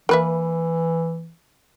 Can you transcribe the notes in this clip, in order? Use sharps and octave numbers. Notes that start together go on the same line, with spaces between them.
E3 A#3 B4 E5